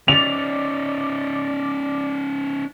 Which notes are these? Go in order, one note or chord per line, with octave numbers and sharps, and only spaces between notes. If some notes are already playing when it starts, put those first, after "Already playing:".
C#4 D#4 D5 F7